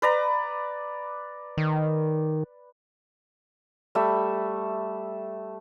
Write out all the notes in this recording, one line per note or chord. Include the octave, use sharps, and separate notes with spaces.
B4 D5 A#5
D#3
G3 A3 E5